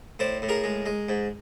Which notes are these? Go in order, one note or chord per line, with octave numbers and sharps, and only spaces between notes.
A2 C5 D5
A2
G#4 A#4
G#3
G#3
G#2